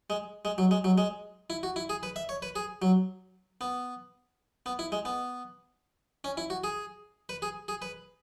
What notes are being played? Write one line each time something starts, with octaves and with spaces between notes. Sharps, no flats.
G#3
G#3
F#3
G#3
F#3
G#3
E4
F#4
E4
G#4
B4
E5
C#5
B4
G#4
F#3
B3
B3
E4
G#3
B3
C#4
E4
F#4
G#4
B4
G#4
G#4
B4